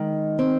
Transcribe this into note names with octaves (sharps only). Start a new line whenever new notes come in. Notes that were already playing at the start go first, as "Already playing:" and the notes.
Already playing: D#3 G#3
C4